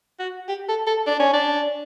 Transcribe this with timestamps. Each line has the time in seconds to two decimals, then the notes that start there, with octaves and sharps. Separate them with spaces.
0.19 F#4
0.48 G4
0.68 A4
0.87 A4
1.07 D4
1.20 C#4
1.33 D4